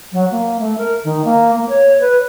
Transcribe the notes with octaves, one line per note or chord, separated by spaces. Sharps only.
F#3
A#3
A3
A#4
D#3
A#3
A#3
C#5
B4